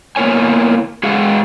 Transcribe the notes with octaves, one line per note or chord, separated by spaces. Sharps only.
A#3 B3 E4 A#4 C#5 G#5
G#3 F#4 G#4 F5 F#5